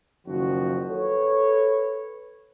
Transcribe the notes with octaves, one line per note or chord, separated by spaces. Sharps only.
F#1 D#3 F3 F#4
A4 B4 C#5